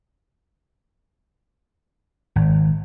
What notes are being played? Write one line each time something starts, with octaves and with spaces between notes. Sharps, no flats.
G#1